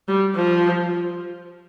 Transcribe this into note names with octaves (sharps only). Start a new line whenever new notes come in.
G3
F3